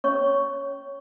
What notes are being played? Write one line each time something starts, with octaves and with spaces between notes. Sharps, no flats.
C#4 C#5 C#6